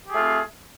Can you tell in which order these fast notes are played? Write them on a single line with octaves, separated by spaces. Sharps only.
G4 G#4 A3 F4 C4